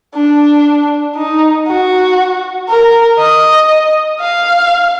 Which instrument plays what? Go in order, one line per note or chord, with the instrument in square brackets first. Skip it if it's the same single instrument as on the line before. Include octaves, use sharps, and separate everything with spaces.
[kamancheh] D4
D#4
F#4
A#4
D#5
F5